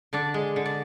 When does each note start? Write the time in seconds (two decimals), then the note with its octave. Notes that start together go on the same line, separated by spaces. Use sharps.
0.13 D3 D4 D5
0.34 G#3
0.56 D3
0.66 D5